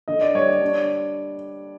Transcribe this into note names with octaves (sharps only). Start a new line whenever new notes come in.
D3 D#5
D5
G3 C#5
D5
D4